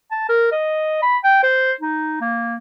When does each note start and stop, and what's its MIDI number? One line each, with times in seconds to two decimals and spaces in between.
0.11 0.24 81
0.29 0.51 70
0.52 0.98 75
1.02 1.17 83
1.24 1.41 79
1.43 1.73 72
1.81 2.21 63
2.21 2.57 58